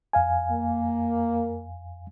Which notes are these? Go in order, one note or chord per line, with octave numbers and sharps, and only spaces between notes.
F2 F5 G#5
A#3